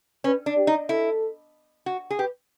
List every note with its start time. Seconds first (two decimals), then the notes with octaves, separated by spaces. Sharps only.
0.24 C#4 B4
0.46 D4
0.57 G4
0.67 D#4
0.89 E4 A4
1.86 F#4
2.10 G#4
2.19 G4 B4